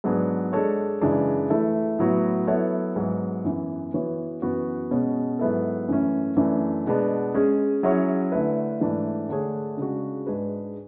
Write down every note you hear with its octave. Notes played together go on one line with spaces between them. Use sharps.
G#2 F#3 B3 D4 G#4
G#3 D4 A4 C#5
F#2 C#3 E3 G#3 D4
E3 A3 E4 A4
A2 F#3 B3 F#4
F#3 B3 E4 A4 C#5
G#2 F#3 B3
F#2 E3 B3
E3 B3 F#4 C#5
F#2 E3 B3 F#4
B2 G#3 C#4 G#4 C#5
G#2 F#3 B3 E4 A4
F#2 E3 A3 C#4
F#2 E3 A3 D4
B2 G#3 B3 D4
G#3 C#4 G#4
F#3 C#4 E4 G#4 C#5
D3 A3 E4 B4
G#2 E3 A3 D4
D3 A3 D4 G#4 C#5
C#3 G#3 D4 F#4
G#2 G#3 D4 G#4 B4